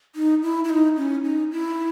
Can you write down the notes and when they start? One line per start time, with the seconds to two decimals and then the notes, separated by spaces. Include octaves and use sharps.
0.16 D#4
0.43 E4
0.64 E4
0.70 D#4
0.97 C#4
1.25 D#4
1.52 E4